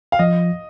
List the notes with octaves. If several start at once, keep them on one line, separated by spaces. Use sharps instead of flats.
F5
F3 D#5